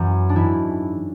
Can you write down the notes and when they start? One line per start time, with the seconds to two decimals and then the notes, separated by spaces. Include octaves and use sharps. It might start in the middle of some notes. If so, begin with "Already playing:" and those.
Already playing: F#2 E3 F#4
0.29 D4
0.35 G#2 E3 E4